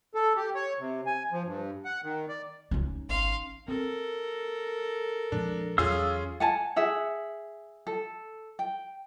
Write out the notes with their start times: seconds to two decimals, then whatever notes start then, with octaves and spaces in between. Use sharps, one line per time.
0.15 A4
0.36 G4
0.55 C#5
0.79 C3
1.06 G#5
1.32 F3
1.46 G2
1.85 F#5
2.03 D#3
2.29 D5
2.71 C#2 C#4 D#4
3.09 G#1 F5 C6
3.68 C4 A4 A#4
5.32 A#2 F3 G#3 D4
5.78 E2 F#3 C#4 F4 G#4 F5 D#6 E6
6.40 F#5 G#5 A5
6.76 G#4 E5 F#5
7.87 A4
8.59 G5